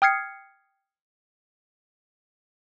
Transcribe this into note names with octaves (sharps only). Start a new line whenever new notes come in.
G5 D#6 F6 G#6 C7 C#7